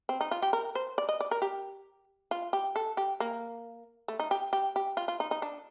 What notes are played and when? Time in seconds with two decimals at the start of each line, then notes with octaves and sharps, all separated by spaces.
0.09 C4
0.21 D#4
0.31 F4
0.42 G4
0.53 A#4
0.75 C5
0.98 D5
1.09 D#5
1.20 D5
1.31 A#4
1.42 G4
2.31 F4
2.53 G4
2.76 A4
2.97 G4
3.20 A#3
4.08 A3
4.20 D#4
4.31 G4
4.53 G4
4.76 G4
4.97 F4
5.08 F4
5.20 D#4
5.31 D#4
5.42 D4